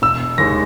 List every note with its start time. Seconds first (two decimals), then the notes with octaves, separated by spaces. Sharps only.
0.02 E1 E6
0.38 D#2 D#3 G#3 A#6